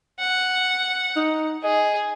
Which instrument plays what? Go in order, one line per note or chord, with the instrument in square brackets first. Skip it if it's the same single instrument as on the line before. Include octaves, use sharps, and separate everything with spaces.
[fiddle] F#5
[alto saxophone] D#4
[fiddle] G#4 [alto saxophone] D#5